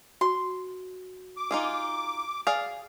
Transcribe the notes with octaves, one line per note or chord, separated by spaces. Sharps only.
F#4 C6
D6
D#4 F4 G#4
G#4 D5 F5